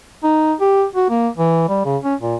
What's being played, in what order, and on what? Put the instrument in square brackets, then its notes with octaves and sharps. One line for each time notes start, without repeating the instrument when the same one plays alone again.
[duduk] D#4
G4
F#4
A#3
E3
G3
C#3
C#4
A#2